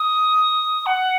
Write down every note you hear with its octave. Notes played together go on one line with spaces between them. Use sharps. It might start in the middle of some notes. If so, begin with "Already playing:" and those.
Already playing: D#6
F#5